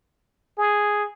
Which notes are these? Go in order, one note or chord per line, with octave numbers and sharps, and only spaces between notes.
G#4